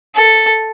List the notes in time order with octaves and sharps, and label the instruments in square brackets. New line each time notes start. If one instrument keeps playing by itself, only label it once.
[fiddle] A4